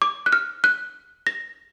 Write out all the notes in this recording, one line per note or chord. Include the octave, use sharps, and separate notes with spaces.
D6
F#6
F6
F#6
A#6